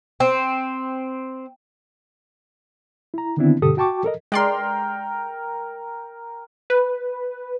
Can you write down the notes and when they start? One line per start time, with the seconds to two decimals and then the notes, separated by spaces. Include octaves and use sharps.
0.20 C4
3.14 E4 A#5
3.37 D3 D#3 B3 C4 D4 E4
3.62 G2 B2 D3 G4 A4 D#6
3.77 F#4 G5 A5 C#6 D6
4.04 A4 A#4 D#5
4.32 G#3 A#4 D5 G5 C6
6.70 B4